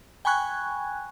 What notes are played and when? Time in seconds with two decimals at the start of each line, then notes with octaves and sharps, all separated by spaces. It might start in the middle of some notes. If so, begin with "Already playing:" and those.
0.25 G5 G#5 B5 C#6 F#6 G#6